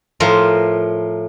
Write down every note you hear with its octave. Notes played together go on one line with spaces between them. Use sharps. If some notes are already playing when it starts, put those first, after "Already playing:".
A2 F3 A#4